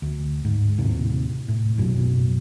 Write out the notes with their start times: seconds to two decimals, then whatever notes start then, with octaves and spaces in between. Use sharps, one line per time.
0.02 D2
0.45 G#2
0.78 D#2 A2 C3
1.48 A2
1.77 A#1 F#2 B2 F#3